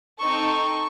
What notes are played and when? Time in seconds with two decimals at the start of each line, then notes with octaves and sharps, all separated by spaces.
0.19 C4 D#4 A4 C#6
0.50 C#6